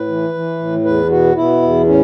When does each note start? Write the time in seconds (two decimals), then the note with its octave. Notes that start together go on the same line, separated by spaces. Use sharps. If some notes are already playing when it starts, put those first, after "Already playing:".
Already playing: A2 B4
0.08 E3
0.34 E3
0.59 A2
0.85 E2 B4
1.10 B2 F#4
1.36 B2 E4
1.62 E2
1.87 A2 C#4